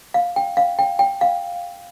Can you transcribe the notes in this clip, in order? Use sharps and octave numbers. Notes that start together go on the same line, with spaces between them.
F5
G5
F5
G5
G5
F5